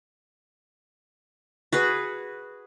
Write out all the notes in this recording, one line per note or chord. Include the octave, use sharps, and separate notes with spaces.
F#4 G#4 B4